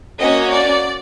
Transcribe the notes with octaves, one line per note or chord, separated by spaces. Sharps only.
A#3 C#4 F#4 D#5
D5